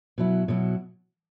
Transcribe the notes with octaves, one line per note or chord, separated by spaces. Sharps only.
B2 F#3 E4
B2 F#3 E4